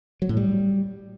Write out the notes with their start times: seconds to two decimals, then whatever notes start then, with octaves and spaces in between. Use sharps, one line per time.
0.22 F#3
0.29 A2
0.37 G3